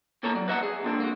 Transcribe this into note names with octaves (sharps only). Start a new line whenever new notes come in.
A#2 E3 A#3 A4 C#5 A#5
F#3 D5
B4 D#5 E5 F#5 A#5
G#4
F2 A#2 D3 D4
A#3 F#4